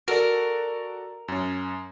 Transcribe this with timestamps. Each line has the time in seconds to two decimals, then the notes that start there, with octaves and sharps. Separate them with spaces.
0.08 F#4 A4 A#4 D5
1.28 F#2 C#4